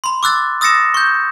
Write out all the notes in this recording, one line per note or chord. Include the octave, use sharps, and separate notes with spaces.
B5 C6
D6 E6 F#6 A6
D#6 E6 A6 A#6 C#7 E7
C#6 G6